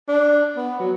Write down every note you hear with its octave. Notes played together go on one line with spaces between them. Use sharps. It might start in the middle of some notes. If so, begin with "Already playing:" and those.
D4
B3
F#3